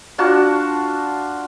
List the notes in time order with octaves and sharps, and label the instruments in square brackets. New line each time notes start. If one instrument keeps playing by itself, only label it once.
[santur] D4 F4 F#4 A5